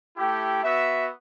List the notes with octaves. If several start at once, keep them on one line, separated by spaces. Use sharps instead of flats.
A3 E4 G4
B3 F#4 E5